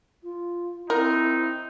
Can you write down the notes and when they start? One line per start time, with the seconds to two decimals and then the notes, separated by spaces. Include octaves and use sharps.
0.23 F4
0.90 C4 D#4 E4 A#4